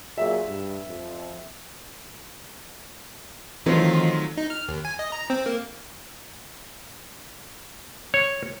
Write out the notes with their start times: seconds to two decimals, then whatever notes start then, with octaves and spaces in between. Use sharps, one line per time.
0.18 A#2 F#3 G#4 E5
0.47 G2
0.87 F2
3.66 D#3 E3 F#3 A3 C4 D#4 F4
4.37 D#4
4.50 F6
4.68 D#2
4.85 G#5
4.99 D#5
5.12 A#5
5.30 C4
5.46 A#3
8.14 C#5